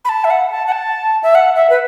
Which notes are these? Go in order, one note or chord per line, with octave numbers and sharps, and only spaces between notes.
B5
A5
E5
F#5
A5
F#5
A5
E5
F#5
E5
B4